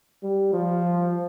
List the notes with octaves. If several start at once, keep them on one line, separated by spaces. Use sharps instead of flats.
G3
F3